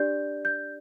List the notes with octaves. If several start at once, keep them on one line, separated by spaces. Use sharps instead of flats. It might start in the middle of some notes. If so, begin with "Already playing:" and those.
Already playing: D4 G4 D5 G6
G6